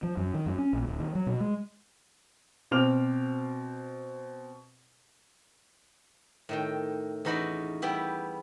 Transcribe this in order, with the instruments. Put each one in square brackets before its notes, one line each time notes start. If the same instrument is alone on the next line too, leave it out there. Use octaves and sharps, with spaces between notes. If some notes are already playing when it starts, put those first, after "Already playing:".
[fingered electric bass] F3
F#2
D#3
F#2
C#4
A#1
D1
D#3
F#3
B2
G#3
[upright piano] B2 C4 C5 D6 F6 F7
[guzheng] A2 D#3 G5
E2 C#4 D#4 F#4 B4 D5
G3 B3 E4 G4